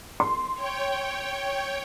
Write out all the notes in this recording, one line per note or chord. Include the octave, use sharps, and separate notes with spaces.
C6
C#5 G5